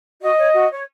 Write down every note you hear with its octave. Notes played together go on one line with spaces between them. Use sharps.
F#4 D#5
C#5
F#4
C#5